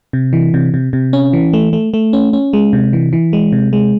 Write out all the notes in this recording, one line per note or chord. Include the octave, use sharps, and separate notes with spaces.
C3
E3
C3
C3
C3
C#4
E3
A3
A3
A3
C#4
C#4
G#3
C3
E3
E3
G#3
C3
G#3